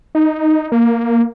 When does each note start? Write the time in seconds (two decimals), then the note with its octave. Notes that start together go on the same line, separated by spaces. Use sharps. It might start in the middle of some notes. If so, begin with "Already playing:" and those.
0.15 D#4
0.72 A#3